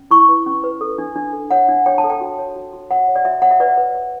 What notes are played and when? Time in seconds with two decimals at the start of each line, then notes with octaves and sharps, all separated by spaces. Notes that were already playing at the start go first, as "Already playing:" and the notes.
Already playing: C#4
0.11 E4 C#6
0.29 B4
0.46 C#4
0.64 B4
0.81 A4
0.98 D4
1.16 D4
1.33 A4
1.51 C#5 F#5
1.69 D4
1.86 C#5 G5
1.98 A5
2.04 A4
2.10 G5
2.21 F#4
2.38 C#5
2.56 F#4
2.73 F#4
2.90 C#5 F#5
3.08 C#5
3.16 D5
3.25 F#4 E5
3.42 C#5 F#5
3.51 E5
3.60 B4 D5
3.78 B4
3.95 B4